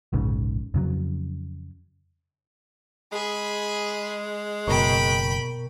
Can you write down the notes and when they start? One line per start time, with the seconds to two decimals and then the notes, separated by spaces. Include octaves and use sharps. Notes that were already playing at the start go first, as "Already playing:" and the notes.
0.13 F1 A#1 G#2 C#3
0.74 F2 C#3 F#3
3.12 G#3 G#4 B5
4.68 F#1 B2 A#4 G5 B5 C#6